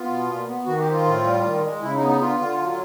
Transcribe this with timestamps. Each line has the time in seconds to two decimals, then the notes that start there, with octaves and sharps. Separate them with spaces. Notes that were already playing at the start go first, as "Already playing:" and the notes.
Already playing: B3 F4
0.08 B2
0.27 A#2
0.46 B3
0.66 D#3 F#4
0.79 G4
0.86 C4
0.92 F4
1.05 A2
1.24 G3
1.43 D#3
1.63 G#3
1.82 C#3 E4
1.96 D#4
2.02 B3
2.08 D#4
2.21 D3 F4
2.40 D3
2.60 F#3